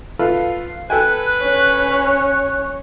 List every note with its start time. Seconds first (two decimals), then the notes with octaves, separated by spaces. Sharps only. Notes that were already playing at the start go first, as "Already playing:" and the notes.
0.19 F4 A4 B4 F5
0.90 A4 B4 G5 G#5 F#6
1.43 C#4 C#5